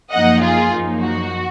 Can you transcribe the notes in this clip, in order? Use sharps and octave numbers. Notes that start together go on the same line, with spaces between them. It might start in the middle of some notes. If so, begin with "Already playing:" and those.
F#2 F3 A#3 D#4 D#5 F#5
F4 G#4
F#2 F3 A#3 D#4
F#4